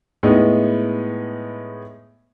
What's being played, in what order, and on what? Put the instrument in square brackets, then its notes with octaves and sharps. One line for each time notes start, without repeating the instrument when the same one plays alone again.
[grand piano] A2 G#3 B3 D#4